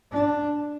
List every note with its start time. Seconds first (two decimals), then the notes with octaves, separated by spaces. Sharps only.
0.12 D4